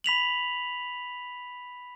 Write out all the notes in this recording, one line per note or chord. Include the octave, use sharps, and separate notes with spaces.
B5 B6 F7 F#7